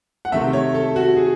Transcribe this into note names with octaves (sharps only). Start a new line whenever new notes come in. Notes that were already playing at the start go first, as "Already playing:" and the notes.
F#5
C3 D#3 A3 E5
C#5
A4
F#4
G#4